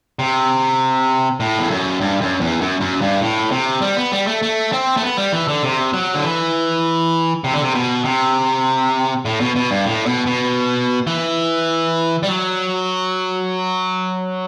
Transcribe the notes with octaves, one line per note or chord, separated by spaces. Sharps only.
C3
A2
E2
F#2
G2
F#2
E2
F#2
F#2
G2
A2
C3
G3
B3
G3
A3
A3
C4
A3
B3
G3
E3
D3
C3
F#3
D3
E3
C3
D3
C3
B2
C3
A2
B2
B2
G2
A2
B2
B2
E3
G3
F#3